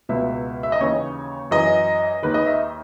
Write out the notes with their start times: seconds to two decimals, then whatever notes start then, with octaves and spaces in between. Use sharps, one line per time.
0.09 C#2 B2 E5
0.63 E5
0.72 D#5
0.80 D#2 C#3 E3 C#5
1.51 F#2 E3 D#5
2.23 D#2 D#3 B4
2.34 D#5
2.46 E5